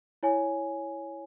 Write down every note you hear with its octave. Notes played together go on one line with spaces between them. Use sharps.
E4 C#5 G#5